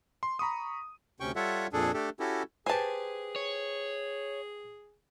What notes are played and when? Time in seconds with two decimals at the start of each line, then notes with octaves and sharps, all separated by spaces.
0.23 C6
0.39 A#5 B5 C#6 D#6
1.20 D2 C3 C#4 G5 C#6
1.36 G3 F4 A4 C#5 E5 F#5
1.73 F2 A#2 D4 G#4 A4
1.94 A3 D4 G4 A4
2.20 C#4 E4 F#4 G4 A4
2.66 G4 G#4 B4 C5 G#5 A5
3.36 C#5